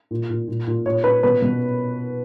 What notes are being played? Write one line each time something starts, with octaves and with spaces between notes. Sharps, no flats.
A#2
A#2
A#2
A#2
A#2 C#5
A#2 B4
B2 B4
B2